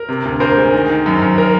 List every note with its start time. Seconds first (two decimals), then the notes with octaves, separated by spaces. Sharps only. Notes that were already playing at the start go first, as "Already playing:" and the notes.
Already playing: A#4
0.09 C3
0.25 D2
0.40 D2 A#4 C5
0.57 G#3
0.74 D#3
0.90 D#3
1.06 F#2
1.22 F#2
1.38 A#4